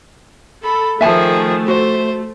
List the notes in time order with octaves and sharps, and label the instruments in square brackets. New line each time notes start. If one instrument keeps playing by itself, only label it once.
[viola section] A4 [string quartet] B5
[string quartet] D#3 F3 G#4 [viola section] A3 [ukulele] E5 G#5 A5
[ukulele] F#4 [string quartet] C5